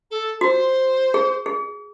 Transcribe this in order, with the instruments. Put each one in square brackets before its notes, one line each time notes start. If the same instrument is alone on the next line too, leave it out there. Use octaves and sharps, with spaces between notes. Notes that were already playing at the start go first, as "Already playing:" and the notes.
[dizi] A4
[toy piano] F#4 [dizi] C5
[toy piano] G#4
G#4